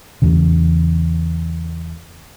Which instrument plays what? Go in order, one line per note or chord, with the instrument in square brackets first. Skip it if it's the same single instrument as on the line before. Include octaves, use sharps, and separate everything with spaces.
[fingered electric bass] E2 C#3